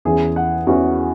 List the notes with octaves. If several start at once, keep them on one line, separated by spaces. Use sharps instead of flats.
E2 E3 C#4 G#4
F#5
E2 E3 C#4 F#4